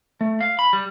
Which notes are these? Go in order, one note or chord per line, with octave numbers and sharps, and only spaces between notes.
A3
F5
B5
G3